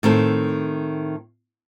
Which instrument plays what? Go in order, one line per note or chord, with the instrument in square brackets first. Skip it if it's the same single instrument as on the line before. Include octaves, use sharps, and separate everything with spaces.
[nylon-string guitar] A2 D#3 C4 A4